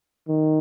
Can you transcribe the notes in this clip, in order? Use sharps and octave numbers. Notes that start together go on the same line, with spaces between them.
D#3